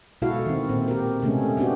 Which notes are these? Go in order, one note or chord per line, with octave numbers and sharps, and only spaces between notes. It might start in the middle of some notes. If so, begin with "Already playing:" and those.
B2 G#3 E4 F#4 A4 F5
D#3 C4
A#2 C4
G4 A#4
C3 G#3 A3 B3 C#4
B3 C4 D4 F#4 G4